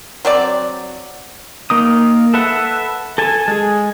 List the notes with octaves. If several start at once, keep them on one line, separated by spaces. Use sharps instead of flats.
F#3 C4 D5
A#3 D#4 D#6
A4 B4 E5 F#5
A4 G#5 A5
G#3 G#4